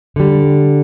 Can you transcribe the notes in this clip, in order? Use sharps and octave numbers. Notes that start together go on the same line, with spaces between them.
D3 G3